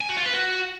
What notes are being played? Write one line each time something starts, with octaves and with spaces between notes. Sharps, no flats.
G#5
F#4
F4
B4
F#4